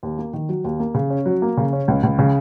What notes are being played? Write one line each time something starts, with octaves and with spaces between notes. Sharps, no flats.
D#2
A#3
D#3
F#3
D#2
A#3
C#3
C#4
F#3
A#3
C#3
C#4
C#2
C#2
C#3